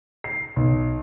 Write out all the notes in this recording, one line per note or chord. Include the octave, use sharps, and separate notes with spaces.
C7
B1